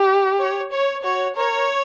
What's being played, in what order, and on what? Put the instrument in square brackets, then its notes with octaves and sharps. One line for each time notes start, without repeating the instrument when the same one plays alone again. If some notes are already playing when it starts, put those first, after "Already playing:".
Already playing: [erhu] G4
[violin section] C#5
C#5
[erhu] F#4 [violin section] C#5
[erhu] A#4 [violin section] C#5